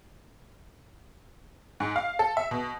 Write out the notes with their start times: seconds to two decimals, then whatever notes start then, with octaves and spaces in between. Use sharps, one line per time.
1.80 G#2
1.96 F5
2.19 A4
2.37 E5
2.51 B2